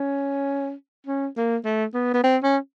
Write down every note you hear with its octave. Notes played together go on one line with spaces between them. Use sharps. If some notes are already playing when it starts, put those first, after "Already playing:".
Already playing: C#4
C#4
A#3
A3
B3
B3
C4
C#4